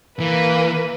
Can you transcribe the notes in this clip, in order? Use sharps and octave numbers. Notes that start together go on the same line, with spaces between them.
E3 A#3 B4